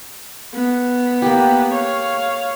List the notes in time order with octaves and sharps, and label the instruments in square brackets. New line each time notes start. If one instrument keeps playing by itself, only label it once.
[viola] B3
[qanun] A#3 G4
[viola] C#5 F5